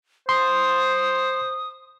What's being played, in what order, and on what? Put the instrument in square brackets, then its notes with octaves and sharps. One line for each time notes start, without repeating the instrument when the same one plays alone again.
[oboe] C5 [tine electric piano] C6 [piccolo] D#6